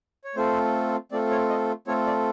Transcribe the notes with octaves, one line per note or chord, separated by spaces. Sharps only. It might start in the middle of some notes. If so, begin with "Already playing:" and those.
C#5
A3 C4 F4 A4 C5
A3 C4 F4 A4 D5
C#5
D#5
A3 C4 F4 A4 C#5
D5